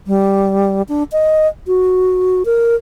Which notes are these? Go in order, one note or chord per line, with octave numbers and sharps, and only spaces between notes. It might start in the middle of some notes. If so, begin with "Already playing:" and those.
G3
D4
D#5
F#4
A#4